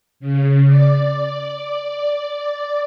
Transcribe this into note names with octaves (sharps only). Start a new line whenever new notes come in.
C#3
D5